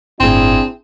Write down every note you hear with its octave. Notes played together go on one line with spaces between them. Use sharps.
G1 A2 C4 D4 E4 G#4